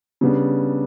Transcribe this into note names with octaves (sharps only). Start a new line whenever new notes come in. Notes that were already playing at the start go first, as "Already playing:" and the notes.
C#3 G3 B3 D4